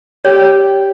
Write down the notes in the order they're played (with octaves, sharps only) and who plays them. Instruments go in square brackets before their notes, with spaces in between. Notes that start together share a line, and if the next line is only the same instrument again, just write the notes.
[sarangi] G4 [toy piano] C#5